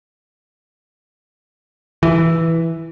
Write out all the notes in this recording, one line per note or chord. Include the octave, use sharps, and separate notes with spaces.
E3